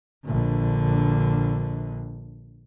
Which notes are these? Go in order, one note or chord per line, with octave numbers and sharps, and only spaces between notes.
A#1 D3